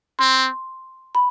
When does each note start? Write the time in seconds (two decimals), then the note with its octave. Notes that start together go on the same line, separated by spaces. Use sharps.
0.19 C4 C6
1.15 B5